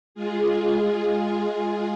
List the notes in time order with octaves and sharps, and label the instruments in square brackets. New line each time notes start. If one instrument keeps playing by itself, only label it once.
[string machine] G#3 F4 G#4